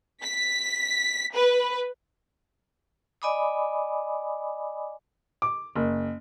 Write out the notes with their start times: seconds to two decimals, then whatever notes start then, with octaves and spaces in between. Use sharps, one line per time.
0.22 B6
1.34 B4
3.22 D5 D#5 G#5 B5 D6 D#6
5.42 D6
5.76 F#1